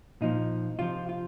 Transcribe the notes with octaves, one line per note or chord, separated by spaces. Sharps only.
A#2 F3 D#4
C3 F3 F4
F4